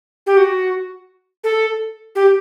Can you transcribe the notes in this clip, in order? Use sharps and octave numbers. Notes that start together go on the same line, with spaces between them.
G4
F#4
A4
G4